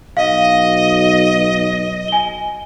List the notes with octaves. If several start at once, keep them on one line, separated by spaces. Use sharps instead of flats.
B1 D#5 F5
G#5 G7